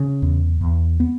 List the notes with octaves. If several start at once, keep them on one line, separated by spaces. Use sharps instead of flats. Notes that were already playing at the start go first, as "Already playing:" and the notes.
Already playing: C#3
E2
E2
B3